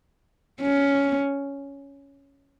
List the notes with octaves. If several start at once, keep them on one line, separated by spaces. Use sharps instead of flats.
C#4